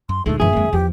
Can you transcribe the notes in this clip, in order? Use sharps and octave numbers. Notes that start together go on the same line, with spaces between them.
F#2 C6
D2 A#2 D3 G#3 A3 D#4
F#2 E3 G#4 E5
F2 D#3 G#3 A#3
E2 F3 G4